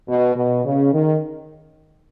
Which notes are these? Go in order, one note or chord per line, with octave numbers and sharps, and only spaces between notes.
B2
B2
C#3
D#3